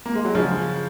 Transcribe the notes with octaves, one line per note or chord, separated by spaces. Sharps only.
A#3
G#3
F#3
C#3 F3